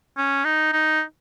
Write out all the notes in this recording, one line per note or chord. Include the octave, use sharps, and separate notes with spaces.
C#4
D#4
D#4